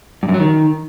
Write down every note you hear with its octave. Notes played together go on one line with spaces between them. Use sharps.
G2
F#2
F#3
D#3